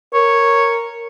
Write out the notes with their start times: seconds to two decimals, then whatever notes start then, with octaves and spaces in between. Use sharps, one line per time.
0.14 A#4 C#5